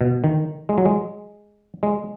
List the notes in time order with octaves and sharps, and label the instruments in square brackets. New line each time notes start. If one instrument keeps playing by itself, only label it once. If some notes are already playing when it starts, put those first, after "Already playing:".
[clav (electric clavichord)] B2
D#3
G#3
F#3
G#3
G#3